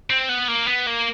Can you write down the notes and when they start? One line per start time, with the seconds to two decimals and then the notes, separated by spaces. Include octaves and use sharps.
0.10 C4
0.29 B3
0.48 A#3
0.68 B3
0.87 A#3